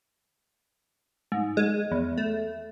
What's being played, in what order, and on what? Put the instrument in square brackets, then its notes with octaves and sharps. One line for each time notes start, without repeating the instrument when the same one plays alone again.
[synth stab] G#2
G#3
E2
A3